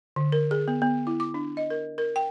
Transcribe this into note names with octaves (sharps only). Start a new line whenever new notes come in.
D3
A#4
G#4
B3
B3
E4
D6
D4
D#5
A#4
A#4
G5